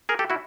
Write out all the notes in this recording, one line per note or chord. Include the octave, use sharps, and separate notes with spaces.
G#4 A#4
G4 A4
E4 F#4